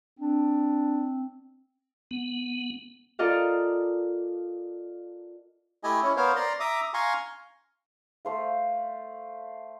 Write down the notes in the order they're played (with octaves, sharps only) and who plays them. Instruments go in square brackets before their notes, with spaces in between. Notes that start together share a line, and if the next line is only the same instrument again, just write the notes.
[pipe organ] C4 [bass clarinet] D4
[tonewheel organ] B3
[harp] F4 A4 A#4 D5 D#5 F5
[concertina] A3 E4 G4 D#5 G#5
C#4 E4 C#5
B3 A#4 C5 C#5 F5
D5 A#5 C6
E5 A#5 D6 D#6
F5 G#5 A#5 C6 C#6
[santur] A3 C5 F5